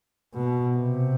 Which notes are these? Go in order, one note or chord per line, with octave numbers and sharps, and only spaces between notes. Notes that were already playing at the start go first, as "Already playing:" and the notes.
B2
C3